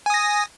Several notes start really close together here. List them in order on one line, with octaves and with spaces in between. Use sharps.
G#5 D#6 A#6